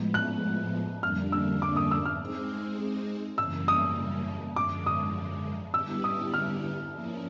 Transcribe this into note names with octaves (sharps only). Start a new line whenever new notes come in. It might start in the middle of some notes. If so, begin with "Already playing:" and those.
Already playing: A2 F3 G#3 B3
F#6
F2 D3 G3 A#3 D4 F6
E6
D6
D#6
E6
F6
G#3 C4 D#4 G#4 C5
F#2 C#3 E3 G3 A#3 E6
D#6
F#2 D3 F3 G#3 D6
D#6
D3 G3 B3 E4 G4 E6
D#6
F6
F3 A#3 C#4 E4